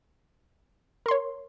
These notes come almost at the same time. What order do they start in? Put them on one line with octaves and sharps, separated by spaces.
A#4 C6 C#5